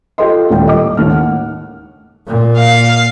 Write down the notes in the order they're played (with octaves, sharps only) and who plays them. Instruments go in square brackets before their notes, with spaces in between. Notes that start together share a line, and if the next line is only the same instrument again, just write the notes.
[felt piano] F4 G4 A4 C5 D#5 C6
D#1 A2 G3 A3 F4 G5
D#5 D6
D#2 A2 F6
F#5
[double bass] A#2
[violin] F5